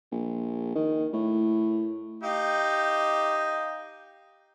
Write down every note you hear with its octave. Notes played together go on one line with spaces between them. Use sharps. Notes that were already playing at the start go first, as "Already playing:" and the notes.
A#1
D#3
A2
D#4 G4 F5